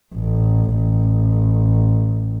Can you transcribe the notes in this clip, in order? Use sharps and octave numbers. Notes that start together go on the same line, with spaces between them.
A1
A1